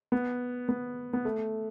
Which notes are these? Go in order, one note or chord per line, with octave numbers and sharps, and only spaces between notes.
B3
B3
B3
A3